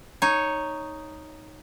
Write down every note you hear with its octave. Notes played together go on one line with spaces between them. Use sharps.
D#4 C#5